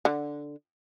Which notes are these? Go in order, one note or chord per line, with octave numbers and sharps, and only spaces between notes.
D3